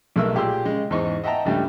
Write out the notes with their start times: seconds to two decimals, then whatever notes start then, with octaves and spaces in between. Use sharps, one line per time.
0.16 B1 G#3 A3 A#4 E6
0.35 A#2 G4 G#4 C6 E6
0.65 C#3 G#3
0.91 E2 G#2 D#4 C#6
1.24 D#5 E5 F#5 G5 A5 A#5
1.45 C#2 G2 G3 A3